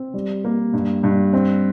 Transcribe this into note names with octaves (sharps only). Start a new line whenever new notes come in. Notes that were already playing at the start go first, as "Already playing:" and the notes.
Already playing: C4
G3
A#3
G2
G2
C4